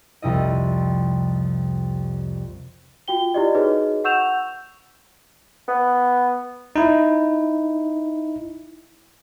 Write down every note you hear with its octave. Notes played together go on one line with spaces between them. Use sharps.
C2 F2 C3 E4 D#5
F4 F#4 G5 G7
E4 F#4 G4 D5 D#5
D#4 F#4 G#4 B4 C#5 D#5
F#5 C#6 E6 G6 E7 F7
B3
D#4 E4